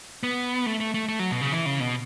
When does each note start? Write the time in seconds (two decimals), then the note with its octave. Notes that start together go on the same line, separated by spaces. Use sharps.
0.23 B3
0.66 A3
0.80 A3
0.94 A3
1.08 A3
1.19 F#3
1.31 B2
1.41 C#3
1.52 E3
1.66 C#3
1.80 B2